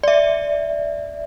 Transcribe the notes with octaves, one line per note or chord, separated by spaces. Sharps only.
D5 E5